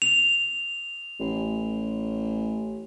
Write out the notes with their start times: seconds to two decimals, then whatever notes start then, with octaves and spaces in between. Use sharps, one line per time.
0.02 F7
1.20 A1